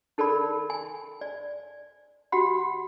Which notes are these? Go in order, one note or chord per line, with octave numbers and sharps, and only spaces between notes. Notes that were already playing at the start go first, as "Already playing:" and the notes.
D#4 A4 A#4 D5 B5
G#5
D5
F#4 G4 F#5 B5